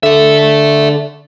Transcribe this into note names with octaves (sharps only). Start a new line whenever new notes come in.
D3 A4 E5